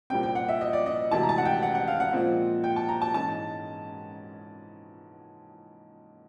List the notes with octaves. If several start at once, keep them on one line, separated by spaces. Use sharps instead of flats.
C2 A#2 G3 C4 G5
G5
F#5
E5
D#5
D5
D#5
D2 C3 E3 G#3 A5
A#5
A5
F#5
G5
F#5
F#5
F5
F#5
A#2 F3 G#3 C4
G5
A5
A#5
A5
G#2 E3 G#3 C#4 A5